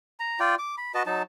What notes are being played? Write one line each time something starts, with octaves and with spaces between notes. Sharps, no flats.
A#5
F4 D5 G5
D6
B5
F#4 B4 D#5 A5
F#3 D#4 A5